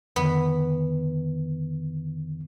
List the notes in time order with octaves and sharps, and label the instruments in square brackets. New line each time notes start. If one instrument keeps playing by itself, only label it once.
[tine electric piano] F2 D3 D#3 [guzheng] B3